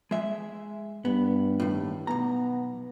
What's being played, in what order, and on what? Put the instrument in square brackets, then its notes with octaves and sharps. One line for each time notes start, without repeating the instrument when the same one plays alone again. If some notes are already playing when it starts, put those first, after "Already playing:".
[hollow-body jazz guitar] G#3 E5
[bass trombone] G2 [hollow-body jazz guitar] B3
[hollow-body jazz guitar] D#2 A2
[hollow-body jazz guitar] B1 A#5 [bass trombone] B3